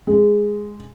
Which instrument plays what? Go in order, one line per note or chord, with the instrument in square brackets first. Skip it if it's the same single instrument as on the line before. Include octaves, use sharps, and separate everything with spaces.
[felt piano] G#3